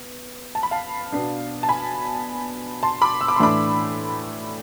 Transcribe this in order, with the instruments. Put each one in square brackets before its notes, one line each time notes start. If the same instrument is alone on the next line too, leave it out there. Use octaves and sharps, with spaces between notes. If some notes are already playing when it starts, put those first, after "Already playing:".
Already playing: [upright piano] B3
A5
B5
F5 A5
B2 B3 D4
A5
G#5 B5
A5 C6
B5 D6
E6
D6
C6
A2 E3 A3 D4 B5 D6